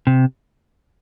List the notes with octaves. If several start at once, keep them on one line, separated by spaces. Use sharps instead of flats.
C3